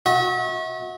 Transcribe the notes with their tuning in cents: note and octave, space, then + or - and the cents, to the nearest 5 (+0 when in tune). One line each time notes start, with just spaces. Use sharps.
F#4 -30 E5 -45